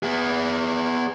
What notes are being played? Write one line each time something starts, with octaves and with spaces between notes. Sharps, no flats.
B3 G#4